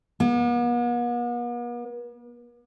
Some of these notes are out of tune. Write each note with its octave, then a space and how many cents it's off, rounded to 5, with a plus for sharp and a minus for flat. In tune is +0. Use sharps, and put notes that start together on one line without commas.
B3 -45